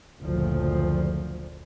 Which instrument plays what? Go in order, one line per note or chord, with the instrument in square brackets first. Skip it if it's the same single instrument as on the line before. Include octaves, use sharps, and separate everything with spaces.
[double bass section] F#1 D2 A#2 F3